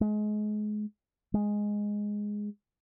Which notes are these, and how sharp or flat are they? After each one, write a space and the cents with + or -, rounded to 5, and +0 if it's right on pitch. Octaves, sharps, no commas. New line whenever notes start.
G#3 +30
G#3 +0